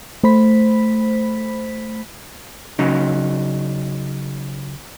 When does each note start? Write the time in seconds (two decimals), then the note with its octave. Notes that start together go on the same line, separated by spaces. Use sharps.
0.24 A3 C5 B5 B6
2.79 C#3 F#3 D#4